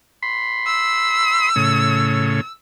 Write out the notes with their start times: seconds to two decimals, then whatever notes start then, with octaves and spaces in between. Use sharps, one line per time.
0.22 B5 C6
0.67 E6
1.56 A2 C#3